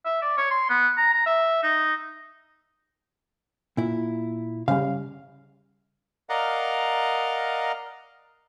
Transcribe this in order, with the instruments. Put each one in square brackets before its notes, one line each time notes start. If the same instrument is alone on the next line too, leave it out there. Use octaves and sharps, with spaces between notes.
[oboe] E5
D5
C#5
C6
B3
A#5
A#5
E5
D#4
[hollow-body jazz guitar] A#2 E4
[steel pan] C#3 G3 [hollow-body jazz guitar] F5
[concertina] A#4 D5 D#5 F5 F#5 A#5